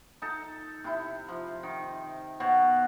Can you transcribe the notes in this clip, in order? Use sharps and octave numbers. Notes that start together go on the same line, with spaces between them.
D#4 A4
C3 E4
F3
D#3
B2 C#5 F#5